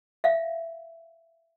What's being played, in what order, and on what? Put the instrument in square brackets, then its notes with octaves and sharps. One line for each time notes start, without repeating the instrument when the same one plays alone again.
[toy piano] E5 F5